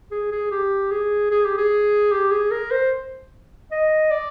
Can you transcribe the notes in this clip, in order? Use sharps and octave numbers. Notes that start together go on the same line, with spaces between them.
G#4
G#4
G4
G#4
G#4
G4
G#4
G4
G#4
A#4
C5
D#5
D5